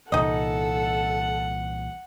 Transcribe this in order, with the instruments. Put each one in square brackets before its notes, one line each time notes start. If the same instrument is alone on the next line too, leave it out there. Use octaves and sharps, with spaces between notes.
[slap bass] C2 A#2 E3 [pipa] D#4 D#5 [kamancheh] A4 [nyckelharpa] F#5